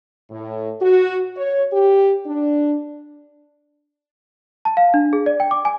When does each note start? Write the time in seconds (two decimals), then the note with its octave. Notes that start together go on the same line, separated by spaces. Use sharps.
0.30 A2
0.81 F#4
1.36 C#5
1.72 G4
2.26 D4
4.65 A5
4.77 F5
4.94 D4
5.13 G#4
5.26 D5
5.40 G5
5.51 D6
5.65 G#5